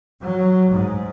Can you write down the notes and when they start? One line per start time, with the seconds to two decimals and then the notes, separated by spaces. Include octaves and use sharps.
0.24 F#3
0.70 G#2